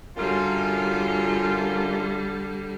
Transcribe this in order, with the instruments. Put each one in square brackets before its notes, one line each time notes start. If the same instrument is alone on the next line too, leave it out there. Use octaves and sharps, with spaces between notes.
[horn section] F#2 F4 [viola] D3 G3